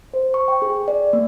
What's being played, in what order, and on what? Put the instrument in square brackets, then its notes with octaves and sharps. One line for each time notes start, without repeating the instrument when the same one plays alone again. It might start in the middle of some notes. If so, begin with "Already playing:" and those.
[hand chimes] C5
C#6
G5
G#4
D5
A#3